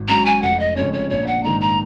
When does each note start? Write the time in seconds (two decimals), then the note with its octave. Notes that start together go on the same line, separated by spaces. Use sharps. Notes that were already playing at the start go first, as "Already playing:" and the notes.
Already playing: G#1
0.08 G#2 F#3 C#4 A#5
0.26 G#5
0.42 F1 F#5
0.60 D#5
0.76 F2 C#3 G#3 C#4 C#5
0.93 C#5
1.10 A#1 C#5
1.27 F#5
1.44 G#2 D#3 A#5
1.61 A#5